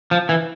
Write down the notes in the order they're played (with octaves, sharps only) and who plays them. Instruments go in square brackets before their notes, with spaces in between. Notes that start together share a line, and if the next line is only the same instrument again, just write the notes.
[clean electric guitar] F3
E3